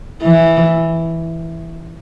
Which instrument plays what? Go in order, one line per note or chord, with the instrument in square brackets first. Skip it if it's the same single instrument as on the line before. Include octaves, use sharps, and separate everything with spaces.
[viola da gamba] E3